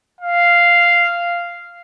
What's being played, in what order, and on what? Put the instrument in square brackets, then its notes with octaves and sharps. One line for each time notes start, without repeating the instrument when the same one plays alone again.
[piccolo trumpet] F5